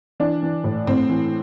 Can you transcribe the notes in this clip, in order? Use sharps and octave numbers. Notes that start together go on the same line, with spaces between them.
E3 D4
E3
A2
A2 C4
E3